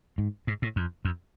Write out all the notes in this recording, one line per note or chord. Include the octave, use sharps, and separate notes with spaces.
G#2
G#2
A2
F2
F2